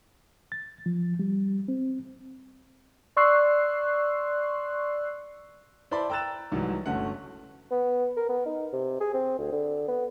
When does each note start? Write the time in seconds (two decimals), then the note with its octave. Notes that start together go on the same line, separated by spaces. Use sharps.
0.52 A6
0.86 F3
1.19 G3
1.68 C4
3.16 D5 C6 C#6 E6 F#6 C7
5.91 E4 C5 D5 A5 B5
6.10 G5 A#5 E6 F#6 A6 E7
6.52 C2 G#2 E3 F#3
6.86 G1 A3 C#4 F#4 F#5
7.71 B3
8.17 A#4
8.29 B3
8.46 D#4
8.73 C3
9.01 G#4
9.14 C4
9.39 D2
9.52 D3
9.88 B3